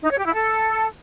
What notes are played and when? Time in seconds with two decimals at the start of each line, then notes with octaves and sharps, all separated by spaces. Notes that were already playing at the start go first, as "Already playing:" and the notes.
0.03 D#4
0.11 C#5
0.18 G4
0.26 E4
0.34 A4